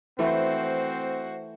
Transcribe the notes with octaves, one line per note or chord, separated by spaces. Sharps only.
E3 A3 C4 F#4 C5